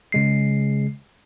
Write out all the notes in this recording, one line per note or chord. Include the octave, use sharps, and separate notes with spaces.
C#3 G#3 C7